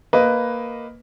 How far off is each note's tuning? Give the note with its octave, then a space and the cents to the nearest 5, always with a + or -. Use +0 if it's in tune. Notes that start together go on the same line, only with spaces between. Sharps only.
A#3 +0 B4 +5 D#5 +0